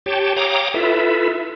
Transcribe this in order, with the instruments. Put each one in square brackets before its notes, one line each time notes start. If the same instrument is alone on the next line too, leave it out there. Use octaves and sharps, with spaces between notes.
[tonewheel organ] G4 C#5 G5 A5
C#5 F5 G5 A#5 D6 D#6
E4 F4 A4 B4 E5